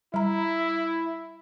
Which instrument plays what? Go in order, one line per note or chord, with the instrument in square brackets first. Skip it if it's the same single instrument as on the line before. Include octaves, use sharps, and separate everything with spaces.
[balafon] G3 A#5 [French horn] E4